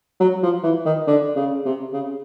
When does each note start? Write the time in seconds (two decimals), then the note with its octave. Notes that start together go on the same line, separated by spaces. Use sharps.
0.21 F#3
0.43 F3
0.64 E3
0.86 D#3
1.07 D3
1.36 C#3
1.66 C3
1.93 C#3